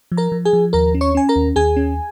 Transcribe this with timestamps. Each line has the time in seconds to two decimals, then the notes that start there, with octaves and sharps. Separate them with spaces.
0.12 F3
0.17 A#4 A#5
0.32 F3
0.45 G#4 G#5
0.53 F3
0.73 D#2 A#4 A#5
0.94 C#4
1.01 C#5 C#6
1.15 C#4 G#5
1.29 A#4 A#5
1.36 D#2
1.56 D#2 G#4 G#5
1.76 C#4